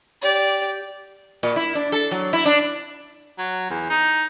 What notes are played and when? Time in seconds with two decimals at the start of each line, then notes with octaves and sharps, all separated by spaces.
0.22 G4 D5
1.43 A#2
1.56 E4
1.75 D4
1.92 A4
2.11 F#3
2.33 E4
2.45 D4
3.38 F#3
3.70 E2
3.90 D#4